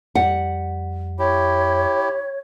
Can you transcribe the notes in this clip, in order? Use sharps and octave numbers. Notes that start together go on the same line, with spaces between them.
F2 G3 F#5
E4 G4 C#5